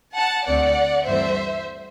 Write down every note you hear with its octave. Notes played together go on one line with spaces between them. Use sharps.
F#5 A5
D2 D3 A3 C4 D5 F#5
G2 E3 A3 C4 C5 E5